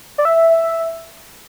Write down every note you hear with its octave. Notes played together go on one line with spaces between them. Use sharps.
D5
E5